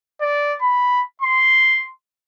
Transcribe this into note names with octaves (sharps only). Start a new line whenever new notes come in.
D5
B5
C6